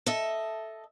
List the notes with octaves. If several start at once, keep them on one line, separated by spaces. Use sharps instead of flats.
A4 D#5 E5